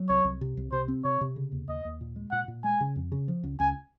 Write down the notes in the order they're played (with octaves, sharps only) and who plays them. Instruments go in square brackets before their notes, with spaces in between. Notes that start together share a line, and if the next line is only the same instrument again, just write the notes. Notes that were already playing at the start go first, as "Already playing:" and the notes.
Already playing: [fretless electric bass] F#3
[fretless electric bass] C2 [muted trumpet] C#5
[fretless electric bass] C2
C3
C2
[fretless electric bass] C3 [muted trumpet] C5
[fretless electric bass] C4
[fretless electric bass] C3 [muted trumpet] C#5
[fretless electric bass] C3
C#3
D#2
[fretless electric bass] D#2 [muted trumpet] D#5
[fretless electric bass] D#2
A#2
G#3
[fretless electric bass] A#2 [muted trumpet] F#5
[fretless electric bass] A#2
[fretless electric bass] G#3 [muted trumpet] G#5
[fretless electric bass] C#3
F2
C#3
F3
C#2
[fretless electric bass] C#2 [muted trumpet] G#5